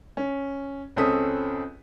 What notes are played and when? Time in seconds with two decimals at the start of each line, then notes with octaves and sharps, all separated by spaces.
0.17 C#4
0.96 C#2 C4 C#4 A4 D#6 B6